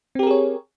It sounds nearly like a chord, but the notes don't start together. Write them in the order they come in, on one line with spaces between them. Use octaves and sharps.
C4 G4 A#4 G#4 C#5